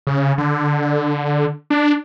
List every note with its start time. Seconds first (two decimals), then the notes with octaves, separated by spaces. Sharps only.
0.07 C#3
0.38 D3
1.70 D4